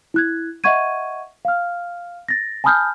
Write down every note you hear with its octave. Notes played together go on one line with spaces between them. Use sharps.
E4 F#6 G#6
D#5 E5 F#5 C#6 G#6 D#7
F5 F6
A6 A#6
G#5 A5 B5 D#6 F6 G6